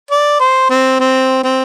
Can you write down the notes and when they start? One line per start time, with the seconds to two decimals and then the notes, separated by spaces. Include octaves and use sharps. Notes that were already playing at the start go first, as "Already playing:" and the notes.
0.11 D5
0.40 C5
0.70 C4
1.00 C4
1.44 C4